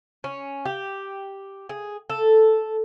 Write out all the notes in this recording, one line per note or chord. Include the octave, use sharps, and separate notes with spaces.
C#4
G4
G#4
A4